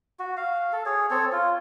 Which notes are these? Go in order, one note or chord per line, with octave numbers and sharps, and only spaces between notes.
F#4
F5
A4
G#4 C#5
C4 A4 C#5
F4